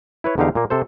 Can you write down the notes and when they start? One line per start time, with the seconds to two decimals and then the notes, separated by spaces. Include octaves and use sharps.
0.24 E4 B4 C#5
0.38 E2 D3 D#4 G4 F5
0.55 A#2 A#3
0.70 C3 A4 C5